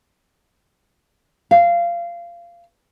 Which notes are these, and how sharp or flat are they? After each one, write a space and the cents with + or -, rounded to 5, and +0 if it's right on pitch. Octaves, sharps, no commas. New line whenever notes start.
F5 -20